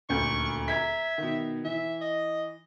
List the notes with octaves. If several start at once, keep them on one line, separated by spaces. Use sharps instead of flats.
D#1 D2 C#6 G6
E5 A#5 G#6 B6
B2 D#3
E3 E5
D#5